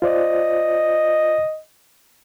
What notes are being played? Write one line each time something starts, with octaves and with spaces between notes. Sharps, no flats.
F4 C5 D5 D#5